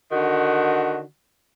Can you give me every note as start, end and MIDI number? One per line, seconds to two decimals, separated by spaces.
0.12 1.02 50
0.12 1.02 51
0.12 1.02 66